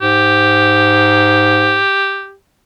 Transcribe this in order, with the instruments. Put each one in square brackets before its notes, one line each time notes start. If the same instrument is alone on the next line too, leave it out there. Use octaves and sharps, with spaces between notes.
[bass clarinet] G#2 [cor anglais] G4